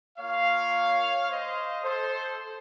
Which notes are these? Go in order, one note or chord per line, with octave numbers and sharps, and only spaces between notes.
A#3 F4 C#5 F5
C5 D#5
A4 C5